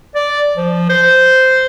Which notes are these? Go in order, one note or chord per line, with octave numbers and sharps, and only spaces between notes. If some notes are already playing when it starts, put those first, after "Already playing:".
D5
F3
C5